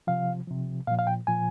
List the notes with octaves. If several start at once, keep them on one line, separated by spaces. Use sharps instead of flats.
C3 F3 F5
C3 F3
A#2 F3 F5
F5
G5
A#2 F3 G#5